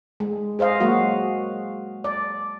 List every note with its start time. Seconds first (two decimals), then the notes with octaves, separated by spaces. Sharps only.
0.20 G#3
0.59 G#4 C5 D#5 F5
0.80 F#3 G#3 A#3 F#4
2.04 D5